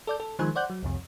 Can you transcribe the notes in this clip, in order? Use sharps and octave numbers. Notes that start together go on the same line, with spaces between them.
A4 D5 G6
A4
D#3 F3 G#3 C5 G#5 F#6
C5 D5 F#5 F#6 G6
F#3
C2 F2 C3